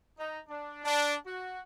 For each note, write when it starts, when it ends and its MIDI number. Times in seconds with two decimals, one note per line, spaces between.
0.18 0.39 63
0.48 0.81 62
0.84 1.15 62
1.26 1.59 66